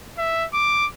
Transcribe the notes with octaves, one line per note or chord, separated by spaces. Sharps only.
E5
D6